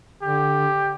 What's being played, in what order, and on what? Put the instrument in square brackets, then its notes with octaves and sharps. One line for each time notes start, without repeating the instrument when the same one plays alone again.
[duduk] D3 [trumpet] G4